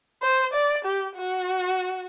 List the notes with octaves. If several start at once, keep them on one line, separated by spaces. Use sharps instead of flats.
C5
D5
G4
F#4